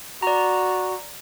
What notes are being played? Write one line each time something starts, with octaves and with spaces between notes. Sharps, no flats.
F#4 D5 A#5